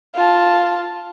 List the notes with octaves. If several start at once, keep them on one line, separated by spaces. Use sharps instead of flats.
F4 A5